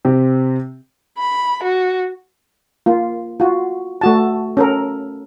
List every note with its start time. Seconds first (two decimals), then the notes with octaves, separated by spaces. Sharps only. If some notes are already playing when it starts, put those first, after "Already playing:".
0.05 C3 C4 G4
1.18 B5
1.63 F#4
2.86 A#3 F4
3.40 F4 F#4
4.01 A3 F#4 A5
4.57 C#4 A4 A#4